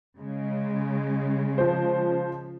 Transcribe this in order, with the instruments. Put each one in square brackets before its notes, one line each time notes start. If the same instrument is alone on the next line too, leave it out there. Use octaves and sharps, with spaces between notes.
[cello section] C#3 G#3
[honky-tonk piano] F3 C5